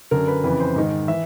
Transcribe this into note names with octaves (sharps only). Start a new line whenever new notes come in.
F#2 D3 A#4
B4
F2 C#3 E3 B4
C5
G#2 D#3
E3 E5